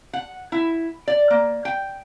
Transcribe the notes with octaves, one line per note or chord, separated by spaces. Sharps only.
F#5
E4
D5
A#3
G5